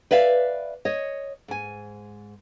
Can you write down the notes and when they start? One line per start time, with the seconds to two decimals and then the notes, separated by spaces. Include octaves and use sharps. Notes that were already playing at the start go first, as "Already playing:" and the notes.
0.11 B4 D5 E5 F5
0.85 C#5 D#5
1.48 G#2 G#5